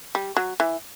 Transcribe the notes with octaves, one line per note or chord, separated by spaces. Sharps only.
G3
F#3
E3